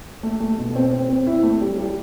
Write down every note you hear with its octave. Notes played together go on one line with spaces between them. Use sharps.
A3
A3
B2
C4
C4
C4
E4
A3
G3
G3